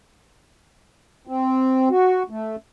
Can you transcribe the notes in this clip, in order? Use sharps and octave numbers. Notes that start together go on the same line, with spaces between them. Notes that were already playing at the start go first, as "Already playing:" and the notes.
C4
F#4
A3